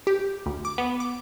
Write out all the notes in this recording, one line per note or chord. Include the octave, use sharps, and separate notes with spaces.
G4
D2
D6
B3
D6